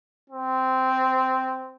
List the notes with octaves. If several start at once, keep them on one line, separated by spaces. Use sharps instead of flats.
C4